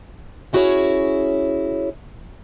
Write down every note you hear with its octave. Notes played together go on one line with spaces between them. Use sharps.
C#4 E4 F#4 G#4 B4 C#5